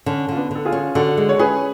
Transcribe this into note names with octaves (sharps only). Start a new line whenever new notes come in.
D3 C#4
D3 F4
B3 D4
D3 A4
F4 G#4
C#4
D3 F#4 A4
G#3
C#5
C#4 G#4 B4